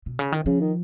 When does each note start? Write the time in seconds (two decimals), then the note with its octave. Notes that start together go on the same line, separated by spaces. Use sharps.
0.06 B2
0.19 C#3
0.32 D#3
0.46 C#3 F3
0.61 D#3